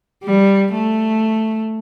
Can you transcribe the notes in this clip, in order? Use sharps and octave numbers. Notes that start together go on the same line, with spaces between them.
G3
A3